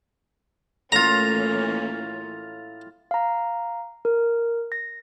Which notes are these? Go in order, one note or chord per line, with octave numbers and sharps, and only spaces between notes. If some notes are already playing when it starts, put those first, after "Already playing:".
A2 E3 A#3 C#4 F4 A#5 A6 F7
F5 A#5
A#4
A#6